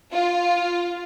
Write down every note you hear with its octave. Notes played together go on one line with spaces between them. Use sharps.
F4